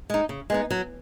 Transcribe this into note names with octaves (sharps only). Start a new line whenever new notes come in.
G#3 D#4
C#3
G#3 B3 D#4
F#3